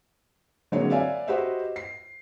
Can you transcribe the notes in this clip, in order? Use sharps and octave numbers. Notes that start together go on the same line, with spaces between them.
D3 F#3 G#3 A#3 C4 C#5
B4 D5 E5 F5 G#5
F#4 G4 B4 C5 D#5 E5
C7